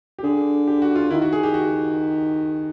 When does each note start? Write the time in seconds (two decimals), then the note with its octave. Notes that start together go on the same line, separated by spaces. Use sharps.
0.19 G4
0.24 D3 G#4
0.67 G4
0.82 F#4
0.96 F4
1.10 D#3 E4
1.22 F#4
1.33 G#4
1.43 G4
1.54 F#4